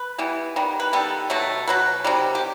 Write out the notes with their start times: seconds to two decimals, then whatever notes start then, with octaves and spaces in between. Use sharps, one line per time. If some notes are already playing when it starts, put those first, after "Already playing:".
Already playing: B4
0.18 E3 G3 B3
0.56 D#3 G3 B3
0.80 B4
0.93 D#3 G3 B3 A4
1.30 B2 F#3 A3
1.68 B2 F#3 B4
2.04 C3 D#3 G3
2.35 G4